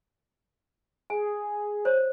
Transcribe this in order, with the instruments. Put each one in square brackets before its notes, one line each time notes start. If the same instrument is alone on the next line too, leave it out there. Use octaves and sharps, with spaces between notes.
[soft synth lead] G#4 [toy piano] G#5
[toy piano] C5 C#5